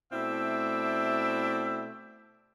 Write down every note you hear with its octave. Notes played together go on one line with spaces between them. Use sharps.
B2 A3 C4 E4 D5 E5